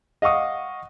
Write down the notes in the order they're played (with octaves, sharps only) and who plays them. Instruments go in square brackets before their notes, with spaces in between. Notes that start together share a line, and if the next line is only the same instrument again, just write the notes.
[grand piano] D#5 F5 F#5 C#6 D#6